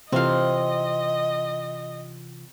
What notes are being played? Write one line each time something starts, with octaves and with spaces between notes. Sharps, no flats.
C3 E3 C4 F4 D#5 F5